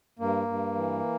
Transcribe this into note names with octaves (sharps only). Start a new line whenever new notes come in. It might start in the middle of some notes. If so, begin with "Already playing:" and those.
G2 A#3
G2
E3